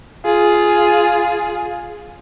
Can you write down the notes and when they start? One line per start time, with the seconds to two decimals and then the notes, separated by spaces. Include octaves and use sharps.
0.25 F4 G#4